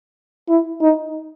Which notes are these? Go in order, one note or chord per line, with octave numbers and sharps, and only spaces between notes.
E4
D#4